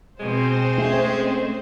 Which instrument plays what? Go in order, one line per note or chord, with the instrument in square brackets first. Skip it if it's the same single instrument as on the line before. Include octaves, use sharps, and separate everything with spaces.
[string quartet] B2 [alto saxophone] G#3 [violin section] C4 C5
[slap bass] A3 [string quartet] C#4 G#4